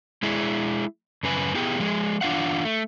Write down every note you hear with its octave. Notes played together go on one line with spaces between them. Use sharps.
G#3 E4 G#4 D5
F#2 C#3 B4 G#5
B3 E4 G4 G#4 G5
F3 G#3 G#4
E3 D4 F4 F5 F#5
A3